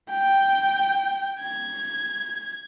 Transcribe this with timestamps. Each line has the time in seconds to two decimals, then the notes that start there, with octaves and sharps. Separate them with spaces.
0.10 G5
1.40 G#6